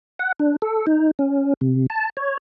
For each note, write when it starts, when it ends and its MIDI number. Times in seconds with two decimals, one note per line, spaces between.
0.19 0.32 78
0.40 0.56 62
0.62 0.86 69
0.87 1.11 63
1.19 1.53 61
1.61 1.86 48
1.90 2.10 81
2.17 2.37 73